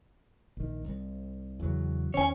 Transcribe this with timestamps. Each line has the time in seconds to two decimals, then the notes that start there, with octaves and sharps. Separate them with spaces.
0.57 A#1 D#3
0.84 C2
1.60 E2 C#3 F#3
2.14 E2 D#3 C#4 C#5 G#5